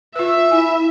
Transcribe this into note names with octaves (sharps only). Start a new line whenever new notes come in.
F4 B4 E5 E6
E4 G#5